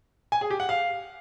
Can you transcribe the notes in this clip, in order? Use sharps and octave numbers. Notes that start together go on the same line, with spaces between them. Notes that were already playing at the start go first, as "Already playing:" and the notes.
G#5
G#4
G4
F#5
F5